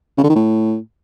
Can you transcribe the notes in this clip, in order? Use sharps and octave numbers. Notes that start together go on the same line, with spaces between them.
C#3
D3
D#3
A2